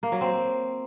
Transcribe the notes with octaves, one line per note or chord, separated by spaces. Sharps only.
A#3
F#3
C4